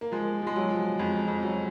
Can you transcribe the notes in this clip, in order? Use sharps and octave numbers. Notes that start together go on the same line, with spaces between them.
A#3
F3 G#3
F3 G#3
F#3
F3
F2 G#3
F2
F#3